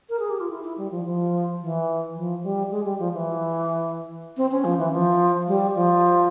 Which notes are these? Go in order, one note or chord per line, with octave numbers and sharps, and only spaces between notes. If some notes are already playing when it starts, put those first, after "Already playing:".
A#4
G#4
G4
F4
E4
E4
G3
F3
F3
E3
F3
G3
G#3
G3
F3
E3
C4
C#4
F3
E3
F3
G3
F3